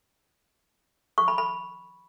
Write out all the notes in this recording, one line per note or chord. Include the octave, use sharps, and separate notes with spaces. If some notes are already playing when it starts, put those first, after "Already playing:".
C#6
B5
B5